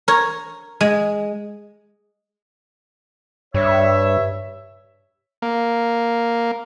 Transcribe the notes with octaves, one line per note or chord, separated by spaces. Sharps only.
A#4 C#5
G#3
G2 C#5 E5
A#3